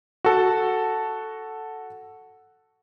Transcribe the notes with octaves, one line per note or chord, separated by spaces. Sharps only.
F#4 A4